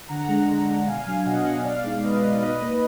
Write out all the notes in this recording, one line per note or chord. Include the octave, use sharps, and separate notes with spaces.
D3 F#5 A#5
G#3 D4
D3
G#3 D4
B2 F5 G#5
F#3 D4
B2 D#5 F#5
F#3 D4
B2 D5 F5
G#3 D#4
B2 B4 D#5
G#3 D#4
F5
B2 B4 D#5
A#3 D#4